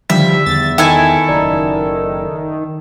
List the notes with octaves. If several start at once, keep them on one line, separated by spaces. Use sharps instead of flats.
D3 D#3 F3 G3 E5
E2 A6
D#3 E4 A4 G5 G#5
F#1 D5 A#5